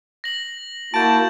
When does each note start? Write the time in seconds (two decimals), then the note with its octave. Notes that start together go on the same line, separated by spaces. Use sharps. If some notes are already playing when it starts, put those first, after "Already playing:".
0.24 A#6 F#7
0.94 A#3 E4 F#4 A5 G6 D7